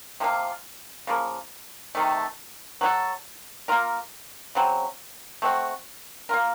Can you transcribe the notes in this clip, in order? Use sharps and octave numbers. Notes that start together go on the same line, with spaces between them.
C3 F3 A#3 F4
C#3 F3 A#3
C3 D#3 A3
F#3 C4 F#4 A4
A#3 F4 A#4
C#3 F#3 C4
A3 C4 F#4
A#3 F4 A#4